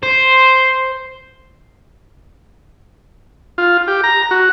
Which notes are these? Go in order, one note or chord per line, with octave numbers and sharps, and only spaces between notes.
C5
F4
G4
A#5
F#4